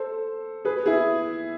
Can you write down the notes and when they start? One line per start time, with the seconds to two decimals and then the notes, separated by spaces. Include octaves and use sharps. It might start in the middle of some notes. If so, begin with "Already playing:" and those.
Already playing: A4 C5
0.65 G#4 B4
0.86 E4 G#4